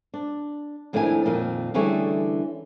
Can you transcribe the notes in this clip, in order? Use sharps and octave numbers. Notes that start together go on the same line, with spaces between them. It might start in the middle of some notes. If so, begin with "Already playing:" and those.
D4
F2 A2 D#3 D4 E4 G#5
F2 A#2 D#3
D3 E3 G3 A3 C#4 G#4